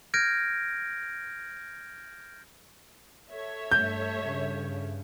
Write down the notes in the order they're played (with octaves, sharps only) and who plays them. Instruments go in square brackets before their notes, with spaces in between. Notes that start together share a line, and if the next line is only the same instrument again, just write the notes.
[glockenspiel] F6 G6 G#6 A#6 D7
[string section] A4 C#5 E5
[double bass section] G2 A3 [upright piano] G6
[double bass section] G2 C#3